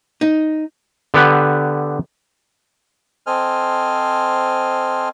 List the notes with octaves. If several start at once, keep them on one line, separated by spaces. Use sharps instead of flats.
D#4
D3 B3 G4 B4
C4 A4 C5 D#5 G#5 F6